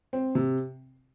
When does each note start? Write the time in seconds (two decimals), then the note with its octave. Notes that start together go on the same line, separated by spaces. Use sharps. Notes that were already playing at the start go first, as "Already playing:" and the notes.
0.13 C4
0.35 C3